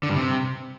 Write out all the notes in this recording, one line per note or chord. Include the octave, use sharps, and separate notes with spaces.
D3
G2
C3